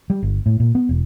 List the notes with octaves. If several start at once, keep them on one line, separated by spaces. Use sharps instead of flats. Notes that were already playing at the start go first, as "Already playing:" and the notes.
G3
G1
A2
A#2
B3
E1